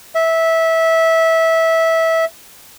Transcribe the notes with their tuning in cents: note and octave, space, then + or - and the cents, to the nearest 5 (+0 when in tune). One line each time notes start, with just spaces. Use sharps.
E5 -15